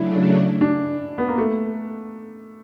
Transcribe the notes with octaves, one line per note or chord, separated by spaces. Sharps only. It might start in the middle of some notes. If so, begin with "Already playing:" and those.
Already playing: C#3 F#3 A3 D4 E4
D4
B3
A#3
A3